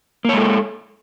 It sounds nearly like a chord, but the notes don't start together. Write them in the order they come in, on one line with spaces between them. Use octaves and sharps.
A#3 C#5 G#3 A4